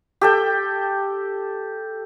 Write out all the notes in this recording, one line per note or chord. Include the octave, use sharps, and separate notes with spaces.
G4 A4 G5